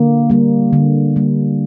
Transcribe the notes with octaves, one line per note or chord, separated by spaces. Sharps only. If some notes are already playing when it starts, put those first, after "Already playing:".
Already playing: D3 A#3
G3 A#3
D3
G3 A#3